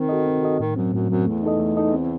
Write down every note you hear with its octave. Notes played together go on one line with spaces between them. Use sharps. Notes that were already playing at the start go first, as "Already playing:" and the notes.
Already playing: D#3 C4
F#4 A4 D#5
C4
F#4 A4 D#5
A2 D#3
F#2 F#3 C4
F#2 A2
F#2 F#3 C4
E2 A3
D#4 A4 D#5
A3
D#4 A4 D#5
C4